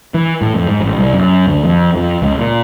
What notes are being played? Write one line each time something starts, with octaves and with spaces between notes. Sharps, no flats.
E3
A2
F2
G#2
A1
C2
F#2
D2
F2
F2
C#2
A#2